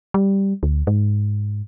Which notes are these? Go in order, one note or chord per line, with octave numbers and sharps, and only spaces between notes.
G3
D2
G#2